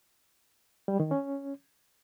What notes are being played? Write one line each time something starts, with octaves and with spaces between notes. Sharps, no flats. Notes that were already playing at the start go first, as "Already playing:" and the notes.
G3
D#3
C#4